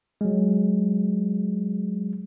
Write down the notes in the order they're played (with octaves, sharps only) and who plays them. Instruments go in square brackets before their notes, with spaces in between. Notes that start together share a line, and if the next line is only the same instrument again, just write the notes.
[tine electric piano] F#3 G#3